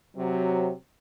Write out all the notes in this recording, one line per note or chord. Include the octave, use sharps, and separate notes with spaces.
C3 F#3